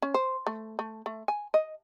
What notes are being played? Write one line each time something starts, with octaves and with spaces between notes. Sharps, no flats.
C#4
C5
A3
A3
A3
G#5
D#5